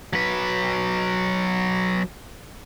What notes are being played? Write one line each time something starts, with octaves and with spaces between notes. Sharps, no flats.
F#3 B4